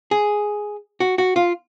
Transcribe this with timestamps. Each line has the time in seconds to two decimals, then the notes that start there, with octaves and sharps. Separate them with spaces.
0.11 G#4
1.00 F#4
1.18 F#4
1.36 F4